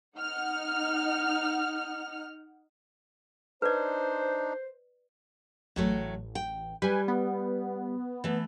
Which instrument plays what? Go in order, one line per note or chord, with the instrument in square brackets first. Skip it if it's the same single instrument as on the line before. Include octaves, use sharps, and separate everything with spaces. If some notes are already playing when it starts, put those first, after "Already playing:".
[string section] D#4 F#5 F6
[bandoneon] D4 D#4 [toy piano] B4 D5 [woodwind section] C5
[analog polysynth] A1 [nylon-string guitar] A2 F#3 A3
[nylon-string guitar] G5
[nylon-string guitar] G3 [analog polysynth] B4 G#5
[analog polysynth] B3
[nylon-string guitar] E3 A3